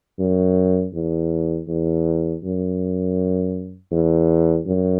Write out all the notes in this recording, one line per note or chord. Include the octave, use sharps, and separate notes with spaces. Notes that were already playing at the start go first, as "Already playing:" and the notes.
F#2
E2
E2
F#2
E2
F#2